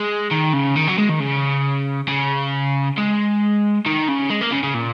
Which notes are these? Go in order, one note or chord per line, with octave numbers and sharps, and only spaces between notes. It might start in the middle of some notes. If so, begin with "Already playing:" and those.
Already playing: G#3
D#3
C#3
D#3
F#3
G#3
D#3
C#3
C#3
G#3
D#3
C#3
G#3
A#3
C#3
C#3
A#2